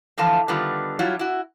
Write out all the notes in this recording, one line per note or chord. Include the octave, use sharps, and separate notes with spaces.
D3 E3 F3 A3 F5 A5
D3 D#3 G3 B3 F4
F#3 G3 E4 F4
E4 F#4